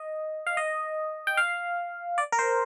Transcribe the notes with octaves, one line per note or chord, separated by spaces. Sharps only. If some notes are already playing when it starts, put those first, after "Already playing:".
Already playing: D#5
F5
D#5
G5
F5
D5
A#4
C5